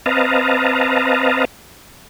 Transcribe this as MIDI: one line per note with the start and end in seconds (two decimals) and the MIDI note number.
0.06 1.45 60
0.06 1.45 71
0.06 1.45 75
0.06 1.45 77
0.06 1.45 81
0.06 1.45 82